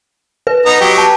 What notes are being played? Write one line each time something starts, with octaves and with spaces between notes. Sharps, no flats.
B4
B3 D#4 A#5
F#3 G4
A5